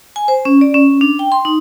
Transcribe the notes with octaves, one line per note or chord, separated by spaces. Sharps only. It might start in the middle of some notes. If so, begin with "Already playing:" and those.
G#5
C5
C#4
D5
C#4
D4
G5
C6
D#4